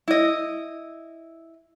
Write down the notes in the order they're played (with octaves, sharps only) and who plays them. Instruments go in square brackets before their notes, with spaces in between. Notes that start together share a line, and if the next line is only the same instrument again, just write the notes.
[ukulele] E4 D#5